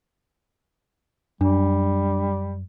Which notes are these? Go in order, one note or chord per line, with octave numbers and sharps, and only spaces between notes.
F#2 G3 D4